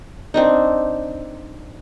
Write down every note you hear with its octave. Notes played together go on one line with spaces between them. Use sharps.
C4 D4 D#4